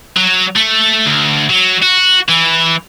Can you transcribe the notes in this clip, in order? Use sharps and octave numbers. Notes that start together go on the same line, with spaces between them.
F#3
A3
D2
F#3
F#4
E3